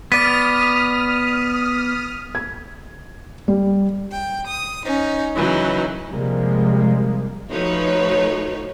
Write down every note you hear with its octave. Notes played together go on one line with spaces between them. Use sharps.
B3 D5 D#6 F6 B6 D#7
G#6
G3
G5
D#6
C#4 D#4
C#3 E3 F#3 D#4
C3 F3 G3 G#3 A#3
F3 A3 D#4 F#4 B4 C#5